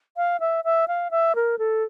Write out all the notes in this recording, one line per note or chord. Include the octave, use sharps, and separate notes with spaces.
F5
E5
E5
F5
E5
A#4
A4